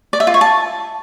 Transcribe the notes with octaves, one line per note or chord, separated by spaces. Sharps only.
D5
E5
F4
C#5
A5